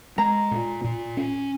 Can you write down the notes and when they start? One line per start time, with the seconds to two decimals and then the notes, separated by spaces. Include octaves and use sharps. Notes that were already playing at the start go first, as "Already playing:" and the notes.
0.18 G#3 A#5
0.51 A#2
0.84 A#2
1.17 C#4